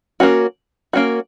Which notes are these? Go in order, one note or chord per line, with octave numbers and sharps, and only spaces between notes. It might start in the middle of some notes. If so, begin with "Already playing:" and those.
A#3 C#4 F#4
A#3 C#4 F#4